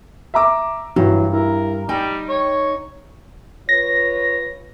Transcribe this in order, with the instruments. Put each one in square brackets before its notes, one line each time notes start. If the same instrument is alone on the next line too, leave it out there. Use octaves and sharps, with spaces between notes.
[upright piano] E5 A#5 D6
[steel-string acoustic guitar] G2 [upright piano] E3 F#3
[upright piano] E4 [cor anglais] A#4
[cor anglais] G3 [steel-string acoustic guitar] D#4 [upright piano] G5
[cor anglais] C#5
[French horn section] F4 B4 C#5 [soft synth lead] A#6